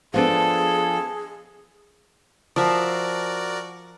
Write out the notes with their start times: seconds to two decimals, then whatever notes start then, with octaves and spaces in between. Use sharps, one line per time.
0.14 F3 B3 D4 G#4 A4
2.56 F3 F#4 A#4 D5 E5